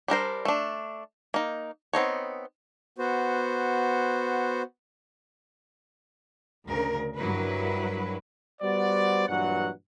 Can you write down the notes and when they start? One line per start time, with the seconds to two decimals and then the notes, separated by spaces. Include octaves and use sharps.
0.08 G3 D4 A#4 C5
0.45 A3 D4
1.34 A#3 D#4
1.93 B3 C4 D#4 C#5
2.98 B3 F#4 C5
6.66 D2 C#3 A#4
7.16 G2 F#3 E4 A#4 B4
8.61 G3 B3 F#4 C5 D5
9.28 G2 A#2 E3 F#3 F#5